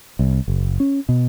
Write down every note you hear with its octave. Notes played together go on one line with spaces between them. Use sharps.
C2
F#1
C#4
B2